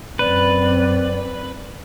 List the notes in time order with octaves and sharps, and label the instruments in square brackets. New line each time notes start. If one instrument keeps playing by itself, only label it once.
[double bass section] F#2 C4 [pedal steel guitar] B4 [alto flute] D5